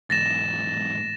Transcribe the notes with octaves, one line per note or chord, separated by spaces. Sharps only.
E2 G#2 A6 A#6 E7